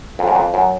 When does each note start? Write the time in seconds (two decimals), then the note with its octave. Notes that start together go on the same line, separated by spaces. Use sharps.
0.19 F2
0.28 F#2
0.35 F2
0.54 F#2